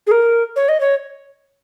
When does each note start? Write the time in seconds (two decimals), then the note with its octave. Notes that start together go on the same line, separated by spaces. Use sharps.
0.07 G#4
0.11 A#4
0.56 C#5
0.69 D#5
0.80 C#5